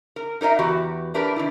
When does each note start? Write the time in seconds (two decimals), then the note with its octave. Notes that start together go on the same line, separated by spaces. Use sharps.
0.16 A#4
0.41 D#4 A#4 C#5 D#5 E5
0.59 E2 E3 F#4 G4
1.14 A3 D4 G4 A#4 B4
1.36 D#3 D4 E4